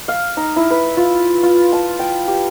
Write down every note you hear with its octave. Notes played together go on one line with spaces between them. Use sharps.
F5
D#4
E4
B4
F4
F4
A5
G5
G4